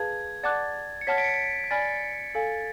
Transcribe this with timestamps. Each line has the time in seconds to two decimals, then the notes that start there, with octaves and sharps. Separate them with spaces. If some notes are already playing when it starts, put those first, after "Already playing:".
Already playing: G#4 B4 F5 A5 G#6
0.43 D5 F#5 A5 D6 F#6 A6
1.01 C#7
1.07 C#5 F#5 A5 F6 B6
1.18 B6 D7
1.24 C#7
1.29 B6
1.64 B6
1.71 D5 G#5 B5 F6 A6
2.35 A4 F5 G#5